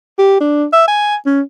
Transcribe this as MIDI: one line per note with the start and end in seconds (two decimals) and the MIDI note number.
0.19 0.38 67
0.40 0.65 62
0.73 0.85 76
0.88 1.16 80
1.26 1.41 61